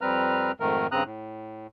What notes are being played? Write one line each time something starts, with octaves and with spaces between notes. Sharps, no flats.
F2 G3 C4 B4 A#5 F6
F2 G#2 D#3 A3 A#4
G2 C#3 C4 A#5 D#6 F#6
A2